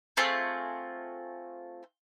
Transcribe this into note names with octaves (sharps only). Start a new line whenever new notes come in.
A3 C4 F4 G#4